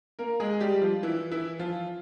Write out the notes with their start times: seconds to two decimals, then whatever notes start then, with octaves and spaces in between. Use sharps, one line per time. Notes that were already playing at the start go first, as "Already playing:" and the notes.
0.19 A#3 A#4
0.40 G#3 G#4
0.61 G3 G4
0.82 F3 F4
1.03 E3 E4
1.31 E3 E4
1.59 F3 F4